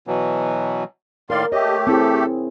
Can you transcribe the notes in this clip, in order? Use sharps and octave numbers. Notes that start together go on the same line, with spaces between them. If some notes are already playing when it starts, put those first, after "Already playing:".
B2 E3 F#3
A2 D#3 A#4 D5 F5 C6
A3 G4 C#5 D#5
C4 E4 G#4 A4